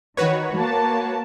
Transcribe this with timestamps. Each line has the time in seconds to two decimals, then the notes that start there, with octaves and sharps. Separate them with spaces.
0.17 D#3 F#4 B4 C#5
0.56 A#3 A5